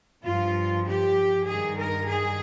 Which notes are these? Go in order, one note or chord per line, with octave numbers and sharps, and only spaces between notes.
G2 F3 F4
G4
G2 D#3 G#4
A#4
G#4